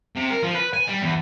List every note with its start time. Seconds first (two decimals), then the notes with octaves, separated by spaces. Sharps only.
0.16 C3
0.31 A#4
0.43 F3
0.55 B4
0.73 G#5
0.88 G3
1.02 E2